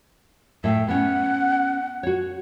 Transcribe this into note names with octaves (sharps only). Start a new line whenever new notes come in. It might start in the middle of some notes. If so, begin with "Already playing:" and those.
A2 E5 G5
B3 C#4 F#5
F#4 C#5